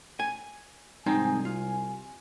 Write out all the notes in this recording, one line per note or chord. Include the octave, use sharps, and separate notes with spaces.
G#5
C2 G#3 C4 D#4 G#5
F4